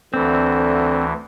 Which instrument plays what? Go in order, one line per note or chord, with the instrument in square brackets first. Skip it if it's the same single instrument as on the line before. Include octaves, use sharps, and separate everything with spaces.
[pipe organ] D2 E3 [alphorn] D3 [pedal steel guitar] C4